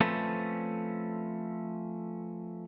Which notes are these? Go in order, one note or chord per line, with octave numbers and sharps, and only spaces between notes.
F3 A3 C4 C#4 A4 B4